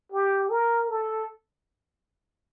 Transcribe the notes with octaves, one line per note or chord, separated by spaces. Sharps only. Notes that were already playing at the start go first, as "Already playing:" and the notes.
G4
A#4
A4